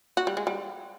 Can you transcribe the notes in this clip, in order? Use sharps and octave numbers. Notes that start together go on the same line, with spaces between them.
F#4
G3
G#3
G3